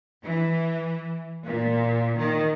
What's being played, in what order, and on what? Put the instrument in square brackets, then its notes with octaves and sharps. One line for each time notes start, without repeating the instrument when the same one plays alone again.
[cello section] E3
A#2
D#3